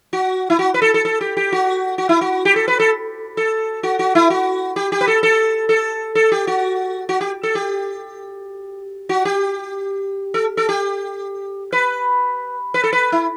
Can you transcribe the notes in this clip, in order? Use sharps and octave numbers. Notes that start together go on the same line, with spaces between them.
F#4
E4
F#4
B4
A4
A4
A4
G4
G4
F#4
F#4
E4
F#4
G4
A4
B4
A4
A4
F#4
F#4
E4
F#4
G4
G4
B4
A4
A4
A4
A4
G4
F#4
F#4
G4
A4
G4
F#4
G4
A4
A4
G4
B4
B4
A4
B4
E4